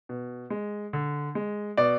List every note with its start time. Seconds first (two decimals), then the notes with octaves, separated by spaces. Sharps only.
0.09 B2
0.50 G#3
0.93 D3
1.35 G#3
1.77 B2 D5